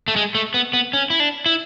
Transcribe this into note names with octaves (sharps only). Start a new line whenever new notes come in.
A3
G#3
A3
B3
B3
C#4
E4
D4
E4